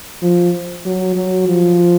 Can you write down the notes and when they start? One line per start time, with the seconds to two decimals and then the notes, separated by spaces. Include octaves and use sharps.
0.23 F3
0.86 F#3
1.16 F#3
1.48 F3